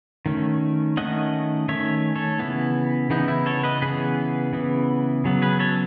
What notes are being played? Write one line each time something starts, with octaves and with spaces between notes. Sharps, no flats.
D#3 A3 C#4
D#3 A3 C#4 D#5 F#5
D#3 A3 C#4 C#5 E5
A4 C#5
C#3 E3 B3 E4
C#3 E3 B3 D#4
E4
A4 C#5
B4 D#5
C#3 E3 B3 G#4 B4
C#3 E3 B3
C#3 F#3 B3
G#4 B4
A4 C#5